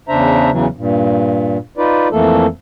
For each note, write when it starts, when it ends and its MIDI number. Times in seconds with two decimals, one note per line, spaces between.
0.09 0.50 40
0.09 0.50 49
0.09 0.50 62
0.09 0.50 72
0.09 0.50 76
0.09 0.50 82
0.51 0.66 40
0.51 0.66 49
0.51 0.66 52
0.51 0.66 54
0.76 1.57 43
0.76 1.57 46
1.77 2.08 63
1.77 2.08 65
1.77 2.08 71
1.77 2.08 74
2.12 2.46 41
2.12 2.46 52
2.12 2.46 57
2.12 2.46 58
2.12 2.46 69